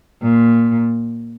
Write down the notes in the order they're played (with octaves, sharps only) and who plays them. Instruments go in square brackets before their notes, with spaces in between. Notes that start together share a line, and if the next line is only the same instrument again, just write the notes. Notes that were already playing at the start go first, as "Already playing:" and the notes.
[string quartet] A#2